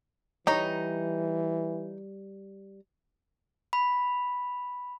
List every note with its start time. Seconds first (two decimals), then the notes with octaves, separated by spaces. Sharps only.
0.47 E3 G3 D#4 C#5 A#5
3.73 B5